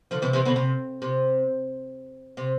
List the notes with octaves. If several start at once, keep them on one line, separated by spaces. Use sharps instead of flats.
D3 F3
C3 E3
C3 E3
B2 D3
C3
C3
C3